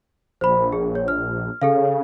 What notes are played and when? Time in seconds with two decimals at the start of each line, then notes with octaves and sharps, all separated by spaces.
0.41 A#1 C5 B5
0.72 G#4
0.95 C#5
1.08 F6
1.62 C#3 G#4 A4 F5